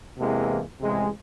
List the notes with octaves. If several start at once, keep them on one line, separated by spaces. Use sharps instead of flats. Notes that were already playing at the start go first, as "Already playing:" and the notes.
E2 C3 E3 G#3 A#3
A1 C3 G#3